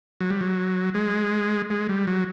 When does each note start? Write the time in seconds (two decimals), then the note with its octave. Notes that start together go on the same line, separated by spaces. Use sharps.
0.21 F#3
0.30 G3
0.41 F#3
0.94 G#3
1.70 G#3
1.89 G3
2.07 F#3